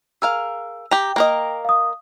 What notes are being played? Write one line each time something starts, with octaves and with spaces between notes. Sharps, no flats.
G#4 A#4 F5 E6
G4 G5 A#5
A#3 A#4 D#5
F5 D#6